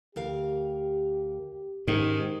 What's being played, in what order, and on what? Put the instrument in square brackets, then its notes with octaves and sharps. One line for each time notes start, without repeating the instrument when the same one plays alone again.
[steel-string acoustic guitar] D2 A#4 F5 [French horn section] G4
[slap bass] G#2 [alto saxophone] D#3 [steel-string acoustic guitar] C#4 G4